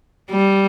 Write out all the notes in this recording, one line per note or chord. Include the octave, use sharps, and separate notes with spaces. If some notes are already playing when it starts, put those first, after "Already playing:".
G3